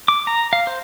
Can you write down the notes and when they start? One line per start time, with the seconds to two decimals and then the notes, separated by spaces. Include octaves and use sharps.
0.08 D6
0.27 A#5
0.53 F5
0.67 C5